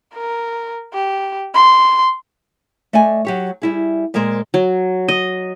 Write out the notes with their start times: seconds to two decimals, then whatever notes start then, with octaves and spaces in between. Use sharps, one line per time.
0.14 A#4
0.93 G4
1.54 C6
2.93 A3 D5 D#5 G#5
3.25 F#3 G4 C#5
3.62 G3 E4 G#4
4.14 A#2 G#3 G#4 A#4 C5
4.54 F#3
5.08 D#5